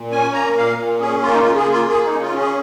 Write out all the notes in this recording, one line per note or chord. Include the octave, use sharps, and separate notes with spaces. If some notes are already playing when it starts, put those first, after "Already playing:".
Already playing: A#2
C#4 G#5
A#3 A#5
A#2 F5
A#2
C#4 G#4
A#3 F4
D#4
C#3 F4
G#4
A#3
F4
A#3 G#4
D#4
C#3
F4
C#4
G#4